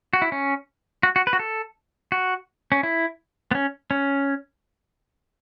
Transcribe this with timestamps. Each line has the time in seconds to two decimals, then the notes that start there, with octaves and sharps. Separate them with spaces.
0.13 F#4
0.22 E4
0.32 C#4
1.03 F#4
1.16 F#4
1.27 B4
1.33 F#4
1.39 A4
2.12 F#4
2.72 C#4
2.83 E4
3.51 B3
3.55 C#4
3.91 C#4